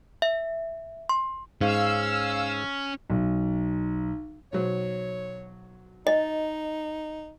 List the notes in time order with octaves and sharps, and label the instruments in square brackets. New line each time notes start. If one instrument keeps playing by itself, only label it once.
[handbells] E5
C6
[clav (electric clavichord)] G#2 [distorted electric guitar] C#4 [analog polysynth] F5 E6
[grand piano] B1
[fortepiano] B1 F#3 C5 [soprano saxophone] C#5
[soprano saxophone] D#4 [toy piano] D#5